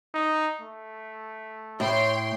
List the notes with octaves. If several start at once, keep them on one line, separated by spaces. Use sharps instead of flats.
D#4
A3
A2 C#5 G5 C6